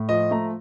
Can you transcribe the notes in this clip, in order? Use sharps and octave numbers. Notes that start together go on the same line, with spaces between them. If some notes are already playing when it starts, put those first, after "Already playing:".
Already playing: A2
F3 D#5
A3 A#5